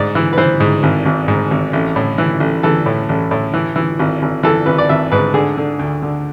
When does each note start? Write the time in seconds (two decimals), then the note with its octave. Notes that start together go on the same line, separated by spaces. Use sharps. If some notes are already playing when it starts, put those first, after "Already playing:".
Already playing: G#2 D5
0.15 E3
0.33 B4
0.38 E3 C5
0.60 G#2
0.83 G#1
1.06 G#1
1.28 G#2
1.51 G#1
1.73 A1
1.96 A2
2.18 E3
2.40 A1
2.63 E3 A4
2.86 A2
3.09 A1
3.31 A2
3.54 E3
3.76 E3
3.99 G#1
4.22 G#1
4.43 E3 A4
4.66 G#1 B4
4.78 D5
4.89 G#1 E5
5.12 G#2 B4
5.34 D3 G#4
5.57 D3
5.79 D2
6.02 D3